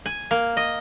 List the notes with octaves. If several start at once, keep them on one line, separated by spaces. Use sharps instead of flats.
G#5
A#3
D#5